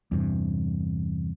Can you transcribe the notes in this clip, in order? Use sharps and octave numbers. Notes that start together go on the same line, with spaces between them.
E2 G2 C3